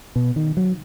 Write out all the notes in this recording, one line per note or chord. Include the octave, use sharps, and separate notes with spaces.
B2
D#3
F#3